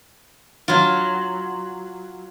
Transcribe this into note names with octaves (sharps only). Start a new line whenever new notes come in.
F#3 F4